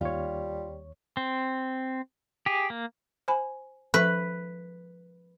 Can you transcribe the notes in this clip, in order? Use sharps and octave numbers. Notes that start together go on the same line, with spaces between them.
D#2 G3 F4 C#5
C4
G4 G#4
A#3
C5 G#5 B5
F3 A4 B4 E5